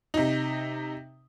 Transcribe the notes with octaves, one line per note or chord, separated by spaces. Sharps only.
C3 D#4